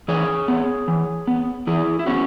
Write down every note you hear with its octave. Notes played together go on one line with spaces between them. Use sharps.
E3 G#4 C#5
B3
E3
B3
E3 E4 G#4
E4
B3 C#4 F#4